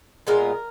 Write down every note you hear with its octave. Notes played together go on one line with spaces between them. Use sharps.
A#2 G#3 B3 F4 A#4